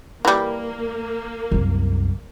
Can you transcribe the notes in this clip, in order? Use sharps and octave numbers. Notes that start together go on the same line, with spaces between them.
E3 G3 A#3
C2 F#2